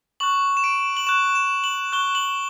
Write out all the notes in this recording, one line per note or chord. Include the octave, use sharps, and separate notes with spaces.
C#6 F#6 F#7
E7
D7
F#7
C#6 F#6 E7
E7
F#7
C#6 F#6 G7
F#7